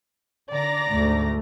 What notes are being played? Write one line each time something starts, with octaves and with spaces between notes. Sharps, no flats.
D3 D5 A#5 A#6
D2 G#2 A3